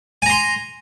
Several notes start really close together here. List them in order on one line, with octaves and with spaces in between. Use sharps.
G#5 A#5 C6